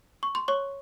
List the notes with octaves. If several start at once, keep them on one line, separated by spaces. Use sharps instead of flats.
C#6
C6
C#5 C#6